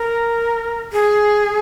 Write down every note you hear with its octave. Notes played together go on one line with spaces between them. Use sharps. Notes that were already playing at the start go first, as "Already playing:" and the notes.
Already playing: A#4
G#4